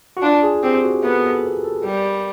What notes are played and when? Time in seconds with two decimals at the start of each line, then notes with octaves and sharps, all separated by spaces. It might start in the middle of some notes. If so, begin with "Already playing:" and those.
0.17 F#4
0.22 D4 F4
0.43 G#4
0.63 C4 G4
0.82 F#4
1.03 B3 A4
1.23 A4
1.44 A#4
1.64 A4
1.83 G3 A#4